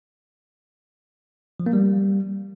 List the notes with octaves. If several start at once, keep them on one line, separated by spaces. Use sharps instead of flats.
F3
A#3
G3